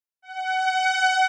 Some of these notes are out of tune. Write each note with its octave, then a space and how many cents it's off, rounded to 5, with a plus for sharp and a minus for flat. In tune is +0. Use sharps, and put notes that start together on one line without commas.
F#5 +25